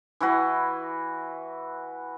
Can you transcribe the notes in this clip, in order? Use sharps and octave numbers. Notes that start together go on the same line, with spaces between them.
E3 E4 F#4 B4